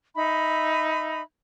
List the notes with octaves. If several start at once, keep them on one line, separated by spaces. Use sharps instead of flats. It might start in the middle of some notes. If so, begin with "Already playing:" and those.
D#4 E5 B5